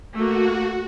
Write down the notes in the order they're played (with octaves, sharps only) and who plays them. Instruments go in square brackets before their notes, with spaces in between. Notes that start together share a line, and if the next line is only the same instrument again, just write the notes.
[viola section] A3 A#3 [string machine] F#4